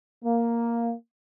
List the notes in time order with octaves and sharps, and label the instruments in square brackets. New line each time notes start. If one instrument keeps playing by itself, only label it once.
[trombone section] A#3